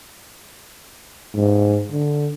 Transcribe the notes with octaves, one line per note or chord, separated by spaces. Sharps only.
G#2
D3